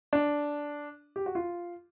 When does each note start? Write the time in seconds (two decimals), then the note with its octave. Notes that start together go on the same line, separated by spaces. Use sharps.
0.13 D4
1.16 G4
1.26 F#4
1.35 F4